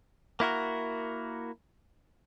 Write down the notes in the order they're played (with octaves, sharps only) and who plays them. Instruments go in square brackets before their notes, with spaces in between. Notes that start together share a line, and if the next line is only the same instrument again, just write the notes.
[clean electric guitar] A#3 E4 F#4 A#4